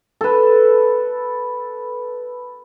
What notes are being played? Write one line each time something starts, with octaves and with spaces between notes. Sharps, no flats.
A4 B4